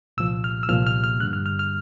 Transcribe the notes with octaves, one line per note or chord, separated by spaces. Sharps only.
C2 A#2 F3 E6
F6
E6
C2 A#2 F3 F6
F6
F6
G2 D3 G3 F#6
F6
F6
F6